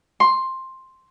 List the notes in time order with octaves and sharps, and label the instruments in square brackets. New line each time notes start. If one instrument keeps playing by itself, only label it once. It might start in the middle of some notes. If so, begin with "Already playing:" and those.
[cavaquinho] C6